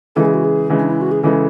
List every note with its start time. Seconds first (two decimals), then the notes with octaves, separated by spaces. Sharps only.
0.16 C#3 E3 G#3 A4
0.25 G#4
0.34 F#4
0.44 G#4
0.70 C#3 E3 G#3
0.79 D4
0.90 E4
1.01 F#4
1.11 G#4
1.23 C#3 E3 G#3 A4